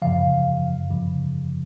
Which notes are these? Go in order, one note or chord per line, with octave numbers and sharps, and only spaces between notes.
F#2 C#3 F3 F5
F#2 C#3 F3